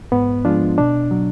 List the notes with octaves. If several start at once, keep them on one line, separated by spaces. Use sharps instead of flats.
G#2 B3
F3 G#3 D4 F4
B2 D4
F#3